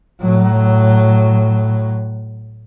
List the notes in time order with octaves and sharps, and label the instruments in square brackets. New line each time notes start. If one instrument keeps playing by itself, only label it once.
[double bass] A2 F#3